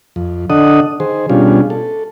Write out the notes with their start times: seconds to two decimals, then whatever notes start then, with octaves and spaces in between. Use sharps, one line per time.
0.16 F2
0.50 D3 D4 A4 D#5 F#5 D#6
1.00 D#3 G#4 C5
1.29 B2 G3 C#4 D4 F4 G#4
1.70 A4